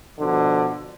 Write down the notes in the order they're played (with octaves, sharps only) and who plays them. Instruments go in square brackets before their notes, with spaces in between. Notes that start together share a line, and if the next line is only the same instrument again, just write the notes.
[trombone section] B2 D3 F3